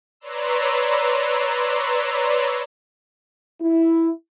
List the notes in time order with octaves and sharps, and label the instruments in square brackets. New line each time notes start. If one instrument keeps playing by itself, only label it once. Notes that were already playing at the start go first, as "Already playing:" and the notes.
[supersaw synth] B4 C#5 D5 A#5 C6 E6
[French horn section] E4